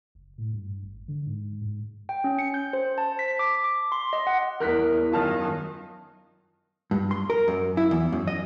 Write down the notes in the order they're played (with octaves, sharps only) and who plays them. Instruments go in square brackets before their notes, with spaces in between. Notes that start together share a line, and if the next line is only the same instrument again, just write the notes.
[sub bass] F#1
A2
G2
G#1
D3
G#2
G#2
[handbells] G5
C#4
C#7
G6
C5
A5
B6
D6
D6
C6
D#5
F#5
[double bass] E2 [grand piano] A#4 F#6 B6
[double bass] F#2 D#3 [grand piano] F4 A5 F6
[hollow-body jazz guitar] G2
C6
A#4
F#2
E4
E2
F#2
D#5